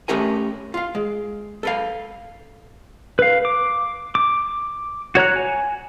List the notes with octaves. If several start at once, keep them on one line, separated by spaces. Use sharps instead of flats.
A3 C#4 G4 A#4 G#5
F4 F5
G#3
A4 B4 F5
B4 F5
D6
D6
F#4 C#5 A#5 F#6
G#5